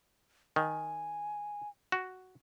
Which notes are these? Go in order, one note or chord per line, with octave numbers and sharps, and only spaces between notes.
D#3 G#5
F#4